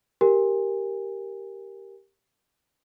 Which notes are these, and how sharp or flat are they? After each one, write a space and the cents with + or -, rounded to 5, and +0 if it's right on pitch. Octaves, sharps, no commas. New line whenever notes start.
G4 +0 A#4 +0 G#5 -30